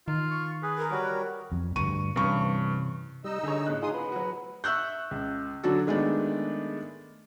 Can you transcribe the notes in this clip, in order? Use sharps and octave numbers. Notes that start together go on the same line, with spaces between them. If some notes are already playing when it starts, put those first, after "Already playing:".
D#3 F4
C#6
G#4 B4
A#4
G3 F#4 C#5
F2
D2 G2 C#6 D#7
G2 C3 E3 C#4 C#6
G3 D#4 D#5 E6
D3 G4 G#4 C#5
A2 C#3 F#6
D#4 F4 G#4 C6 D#6
B3 B4
F#3 F#4
E5 C#6 E6 F#6 G6
C#2
D3 F#3 D4 F#4 A4
D#3 G#3 A3 B3 D4